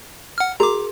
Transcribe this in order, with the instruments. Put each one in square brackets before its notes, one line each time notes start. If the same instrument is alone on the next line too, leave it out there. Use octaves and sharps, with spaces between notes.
[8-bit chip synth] F#5 F6
[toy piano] F#4 G#4 A#4 [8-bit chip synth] A#5 D6